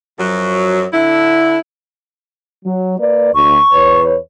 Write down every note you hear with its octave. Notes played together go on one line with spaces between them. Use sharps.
F#2 F3 F#3
D3 E4
F#3
A#3 B4 D5
D2 C#6
E2 B4 C#5